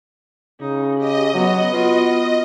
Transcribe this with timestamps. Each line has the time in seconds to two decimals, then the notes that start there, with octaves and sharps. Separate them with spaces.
0.61 C#3 D#4
0.99 G4 D#5
1.34 F#3 B3 D#5
1.73 B3 F4 F#4